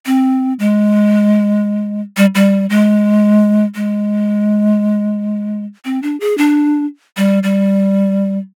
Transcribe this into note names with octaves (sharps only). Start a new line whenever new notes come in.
C4
G#3
G3
G3
G#3
G#3
C4
D4
G#4
D4
G3
G3